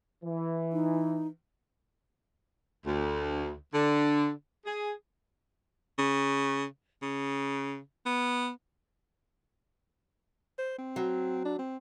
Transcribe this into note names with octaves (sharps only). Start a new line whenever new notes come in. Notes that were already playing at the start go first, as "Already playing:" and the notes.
E3
D#4
D2
D3
G#4
C#3
C#3
B3
C5
C4
F#3
D4
C4